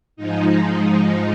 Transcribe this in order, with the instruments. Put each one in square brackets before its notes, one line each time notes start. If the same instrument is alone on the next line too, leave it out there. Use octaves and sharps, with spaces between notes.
[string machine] G#2 F3 G#3 D#4